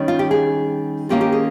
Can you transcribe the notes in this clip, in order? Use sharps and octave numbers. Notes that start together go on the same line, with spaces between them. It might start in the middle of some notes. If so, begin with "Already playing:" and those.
Already playing: D#3 G3 C#4
F4
G4
G#4
D#3 A#3 C#4 F4 G4
G4
G#4